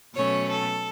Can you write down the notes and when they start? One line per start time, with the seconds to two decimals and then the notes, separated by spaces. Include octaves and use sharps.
0.14 B2 F#3 A3 C#4 C#5
0.49 A4